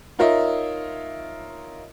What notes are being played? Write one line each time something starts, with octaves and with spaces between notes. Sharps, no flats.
D#4 F4 A#4 C#5 D#5 E5